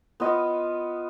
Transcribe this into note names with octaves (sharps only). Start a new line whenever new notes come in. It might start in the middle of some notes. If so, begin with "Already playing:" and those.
B3 F4 D#5